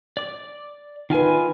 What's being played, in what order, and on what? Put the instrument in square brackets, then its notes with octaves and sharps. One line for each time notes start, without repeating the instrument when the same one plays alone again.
[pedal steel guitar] D5 D6
[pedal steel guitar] D#3 F4 G#5 [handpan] D#4 B4